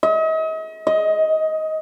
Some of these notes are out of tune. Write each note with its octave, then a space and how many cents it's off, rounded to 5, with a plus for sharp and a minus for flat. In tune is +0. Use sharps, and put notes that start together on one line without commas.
D#5 +40
D#5 +15